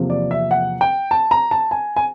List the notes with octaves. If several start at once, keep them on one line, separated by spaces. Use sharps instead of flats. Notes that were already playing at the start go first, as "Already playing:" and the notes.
Already playing: E2 C3 F3 A#3
D5
E5
F#5
G5
A5
A#5
A5
G#5
G#5